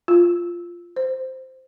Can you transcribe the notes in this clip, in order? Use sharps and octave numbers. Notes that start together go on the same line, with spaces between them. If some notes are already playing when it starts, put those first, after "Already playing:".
F4
C5